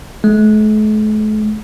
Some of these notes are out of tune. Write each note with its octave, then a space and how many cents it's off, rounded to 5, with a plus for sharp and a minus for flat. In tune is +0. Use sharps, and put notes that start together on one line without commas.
A3 -45